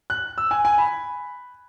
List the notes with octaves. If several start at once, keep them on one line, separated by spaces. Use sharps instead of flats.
F#6
E6
G#5
G#5
B5